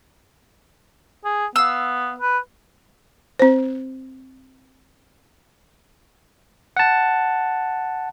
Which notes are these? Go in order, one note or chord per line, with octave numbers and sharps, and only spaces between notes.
G#4
B3 F5 E6
B4
C4 C5
F#5 A5